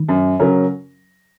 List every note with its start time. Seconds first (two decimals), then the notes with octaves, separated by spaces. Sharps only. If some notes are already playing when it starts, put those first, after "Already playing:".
Already playing: D#3
0.09 F#2
0.39 C#3 F#3 C#4 A#4